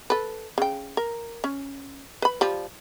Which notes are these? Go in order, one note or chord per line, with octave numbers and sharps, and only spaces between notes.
A4 B4
C#3 G5
A#4
C#4
B4 B5
F3 G3